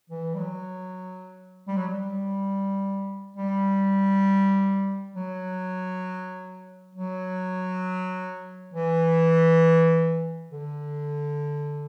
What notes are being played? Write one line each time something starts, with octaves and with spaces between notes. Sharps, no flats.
E3
G3
F#3
G3
F#3
G3
G3
F#3
F#3
E3
D3